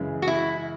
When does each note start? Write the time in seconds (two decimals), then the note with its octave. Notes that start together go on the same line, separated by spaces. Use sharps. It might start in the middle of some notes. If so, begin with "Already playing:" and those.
Already playing: F#2 C#3 E3 G#3
0.22 F#4
0.28 E4